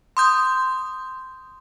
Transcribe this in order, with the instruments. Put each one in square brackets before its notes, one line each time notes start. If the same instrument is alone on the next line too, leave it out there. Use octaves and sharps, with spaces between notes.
[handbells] C6 D#6 G6